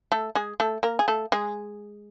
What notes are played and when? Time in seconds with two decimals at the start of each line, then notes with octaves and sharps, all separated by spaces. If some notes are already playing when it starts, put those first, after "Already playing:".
0.12 A3 A4
0.35 G#3 G#4
0.60 A3 A4
0.83 A#3 A#4
0.99 G#4
1.08 A3 A4
1.32 G#3 G#4